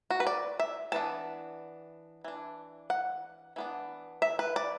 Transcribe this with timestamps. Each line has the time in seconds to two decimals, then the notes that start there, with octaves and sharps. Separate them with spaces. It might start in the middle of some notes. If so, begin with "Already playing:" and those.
0.10 F#4
0.20 B4
0.27 D5
0.59 E5
0.92 E3 B3 D4 A5
2.24 E3 D4
2.90 F#5
3.56 E3 B3 D4
4.22 E5
4.39 B4
4.56 D5